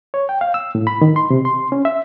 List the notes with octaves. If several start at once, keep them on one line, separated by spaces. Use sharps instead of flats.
C#5
G5
F5
E6
A2
B5
D#3
C6
C3
C6
C#4
E5